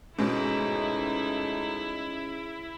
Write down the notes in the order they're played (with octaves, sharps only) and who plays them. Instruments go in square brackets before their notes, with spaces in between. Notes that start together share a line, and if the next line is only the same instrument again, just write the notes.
[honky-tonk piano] G#2 B2 [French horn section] A3 D#4 [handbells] C#4 G#4 C#5 [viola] E4